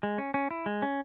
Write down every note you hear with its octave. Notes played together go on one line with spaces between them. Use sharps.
G#3
C#4
C#4
E4
G#3
C#4